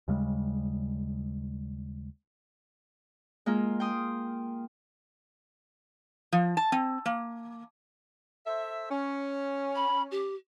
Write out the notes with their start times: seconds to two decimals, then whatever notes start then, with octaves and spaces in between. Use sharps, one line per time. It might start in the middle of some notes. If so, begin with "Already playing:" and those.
0.08 D#2 C#3 G3 G#3
3.46 G#3 A#3 F4
3.80 G5 C6 D#6
6.32 F3
6.57 A5
6.72 C4
7.06 A#3
8.47 A4 C5 E5
8.91 C#4
9.76 B5
10.11 G4